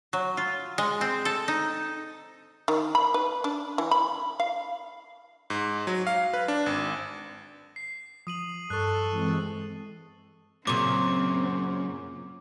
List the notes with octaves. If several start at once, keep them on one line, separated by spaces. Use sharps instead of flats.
F#3
F4
G#3
C4
A4
D#4
D#3
B5
B4
D4
E3
B5
F5
G#2
F#3
F5
B4
D4
G#1
C7
F3 D#6 D#7 F#7
G2 A4 C#6 F#6
E3 G#3 C4
F#2 A#2 C#3 C4 D6